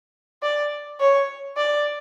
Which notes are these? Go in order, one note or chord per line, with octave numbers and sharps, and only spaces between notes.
D5
C#5
D5